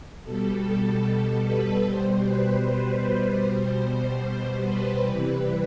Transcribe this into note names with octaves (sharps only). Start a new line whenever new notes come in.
B2 G3 A4
A4
B4
B2 G3 C5
B4
C5
B2 G3 C5
C5
C5
B4
C3 E3 G3 B4